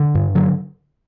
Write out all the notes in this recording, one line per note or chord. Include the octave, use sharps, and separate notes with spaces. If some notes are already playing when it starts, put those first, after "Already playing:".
Already playing: D3
G2
D3 F#3